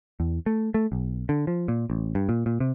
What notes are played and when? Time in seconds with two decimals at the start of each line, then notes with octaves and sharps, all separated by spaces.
0.20 E2
0.46 A3
0.74 A3
0.92 B1
1.29 D3
1.47 F3
1.68 A#2
1.90 A1
2.15 G2
2.29 A#2
2.46 A#2
2.60 C3